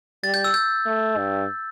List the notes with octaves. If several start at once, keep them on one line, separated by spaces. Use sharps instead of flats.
G3 A6
G6
E6
G6
A3
G2